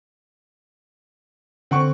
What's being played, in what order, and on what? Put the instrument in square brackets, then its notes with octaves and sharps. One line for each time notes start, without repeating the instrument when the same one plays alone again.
[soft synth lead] D3 [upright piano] C4 F#5 C#6